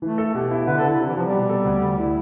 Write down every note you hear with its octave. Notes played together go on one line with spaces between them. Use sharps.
E3 A3
A4
B2 G4
E4
D3 B4
A4
D3
E4
C3
E3
C3 F3
G3
B2
A4
D2
D2
E4